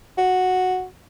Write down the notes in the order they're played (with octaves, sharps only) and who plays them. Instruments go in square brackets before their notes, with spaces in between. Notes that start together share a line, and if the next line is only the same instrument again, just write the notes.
[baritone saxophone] F#4